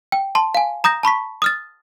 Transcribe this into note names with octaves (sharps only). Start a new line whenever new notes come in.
G5
A5 C6
F5 G#5
A#5 D#6 G6 A#6
A5 B5 C#6 B6
D#6 F6 A6